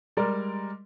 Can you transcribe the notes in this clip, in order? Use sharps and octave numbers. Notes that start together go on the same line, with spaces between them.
G3 G#3 A#4 D5